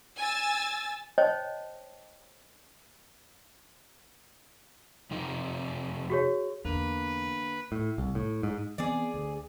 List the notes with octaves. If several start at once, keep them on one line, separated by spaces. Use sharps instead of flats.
G#5 E6 A6
C5 C#5 D#5 G5 A5
F2 C3 D#4
F#4 G#4 C#5
E2 D3 A#3 B4 F7
A2
C2
A2
G#2
E3 B3 C4 G#4 D5
D2